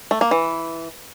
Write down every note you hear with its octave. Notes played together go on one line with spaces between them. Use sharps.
A3
A#3
E3